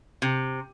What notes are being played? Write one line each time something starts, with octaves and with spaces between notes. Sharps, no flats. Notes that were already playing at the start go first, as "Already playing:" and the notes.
C3